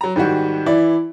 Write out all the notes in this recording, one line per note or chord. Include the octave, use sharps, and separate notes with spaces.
F#3 A#5
G#2 D#3 G3 F#4
E3 E4 D5